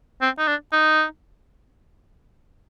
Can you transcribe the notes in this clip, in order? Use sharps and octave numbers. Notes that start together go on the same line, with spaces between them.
C4
D#4
D4
D#4